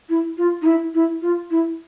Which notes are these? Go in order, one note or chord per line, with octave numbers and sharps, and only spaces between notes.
E4
F4
D#4
E4
E4
F4
E4